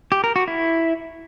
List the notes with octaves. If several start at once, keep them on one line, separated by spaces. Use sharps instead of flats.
G4
A#4
F#4
E4